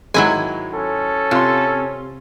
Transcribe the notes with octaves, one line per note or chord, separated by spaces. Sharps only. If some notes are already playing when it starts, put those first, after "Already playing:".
G#2 D#3 F#3 G#3 E4 G#5
C#4 A4
C3 F4 C6